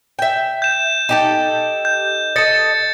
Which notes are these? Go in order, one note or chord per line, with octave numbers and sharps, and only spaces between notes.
E5 G5
G6 E7
D#4 G4 A4
G6
A4 D#5 A6 C#7